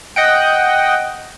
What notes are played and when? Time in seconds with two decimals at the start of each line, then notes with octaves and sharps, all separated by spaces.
0.16 D#5 F#5 G5